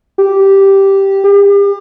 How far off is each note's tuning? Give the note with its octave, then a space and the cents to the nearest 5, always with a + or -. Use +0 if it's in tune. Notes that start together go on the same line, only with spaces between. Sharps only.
G4 -5
G4 +40